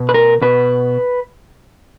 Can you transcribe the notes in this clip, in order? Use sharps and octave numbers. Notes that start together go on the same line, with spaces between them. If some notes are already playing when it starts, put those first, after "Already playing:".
Already playing: B2
B4
A#4
B2 B4